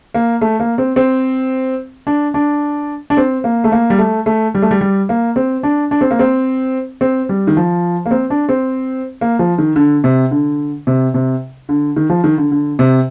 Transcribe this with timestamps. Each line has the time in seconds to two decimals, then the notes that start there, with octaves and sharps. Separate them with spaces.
0.14 A#3
0.41 A3
0.60 A#3
0.78 C4
0.96 C4
2.07 D4
2.34 D4
3.10 D4
3.17 C4
3.44 A#3
3.64 A3
3.72 A#3
3.90 G3
3.99 A3
4.26 A3
4.55 G3
4.62 A3
4.71 G3
4.81 G3
5.09 A#3
5.36 C4
5.63 D4
5.91 D4
6.01 C4
6.11 A#3
6.19 C4
7.01 C4
7.29 G3
7.47 D#3
7.57 F3
8.06 A#3
8.11 C4
8.30 D4
8.49 C4
9.21 A#3
9.39 F3
9.58 D#3
9.76 D3
10.04 C3
10.31 D3
10.87 C3
11.14 C3
11.69 D3
11.96 D#3
12.10 F3
12.24 D#3
12.38 D3
12.52 D3
12.79 C3